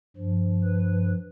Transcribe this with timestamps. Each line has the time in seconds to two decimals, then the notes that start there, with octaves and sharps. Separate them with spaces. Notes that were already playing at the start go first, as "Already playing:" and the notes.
0.16 G2 F3
0.64 B4